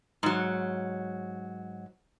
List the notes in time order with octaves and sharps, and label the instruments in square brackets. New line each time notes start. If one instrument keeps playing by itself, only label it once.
[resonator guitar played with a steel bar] G#2 F#3